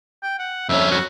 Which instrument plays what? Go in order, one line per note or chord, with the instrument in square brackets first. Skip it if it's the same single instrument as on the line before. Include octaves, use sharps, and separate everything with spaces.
[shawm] G5
F#5
[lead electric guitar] F2 C#4 [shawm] E5
[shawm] F#4